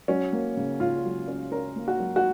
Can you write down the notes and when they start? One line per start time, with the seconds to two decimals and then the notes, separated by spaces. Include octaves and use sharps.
0.08 F#3 C#4
0.33 A#3
0.57 C#3
0.80 C#3 F4
1.05 F#3
1.28 C#4
1.52 C#4 A#4
1.76 A#3
1.88 F#4
2.00 F#3
2.16 F#4